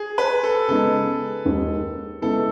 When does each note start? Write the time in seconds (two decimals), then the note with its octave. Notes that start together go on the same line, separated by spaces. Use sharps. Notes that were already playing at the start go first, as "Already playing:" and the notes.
Already playing: G#4
0.18 B4
0.43 A4
0.68 C#3 G#3 B3 D#4 A4
1.45 D#2 D#3 G#3
2.22 C#3 G#3 B3 E4 A4